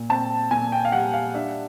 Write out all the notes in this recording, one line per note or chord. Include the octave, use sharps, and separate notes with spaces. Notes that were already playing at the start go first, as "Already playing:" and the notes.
Already playing: A#2
C4 A5
A#2 G#5
G5
F5
G3 F#5
F5
D4 E5